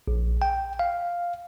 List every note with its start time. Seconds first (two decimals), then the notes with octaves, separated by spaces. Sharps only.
0.08 A#1
0.42 G5
0.79 F5